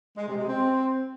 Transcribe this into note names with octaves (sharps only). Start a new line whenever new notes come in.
G#3
C3
G#3
C4